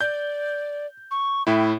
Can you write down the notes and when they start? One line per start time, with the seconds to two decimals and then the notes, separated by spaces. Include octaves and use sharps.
0.01 D5 G6
1.11 C#6
1.47 A2 E4 G5